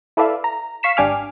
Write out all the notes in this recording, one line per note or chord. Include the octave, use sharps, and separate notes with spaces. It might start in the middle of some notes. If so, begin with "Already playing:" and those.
E4 A4 B4 D5 E5 F5
A#5
F5 C#6 B6 C7 E7
G#1 D4 G4 G#5 D6 F6